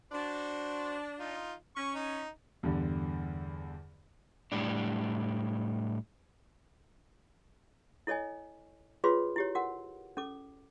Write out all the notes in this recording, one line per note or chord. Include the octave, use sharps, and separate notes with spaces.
D4 F#4 C5
D#4 F4
C#4 C#6
D#4
E2 G2 D3
A2 G3 D4
E4 A4 C#5 D#5 G#5
F4 F#4 G#4 B4 C#5 C6
E4 G4 C#5
F#4 A#4 F#5
C#4 A4 D6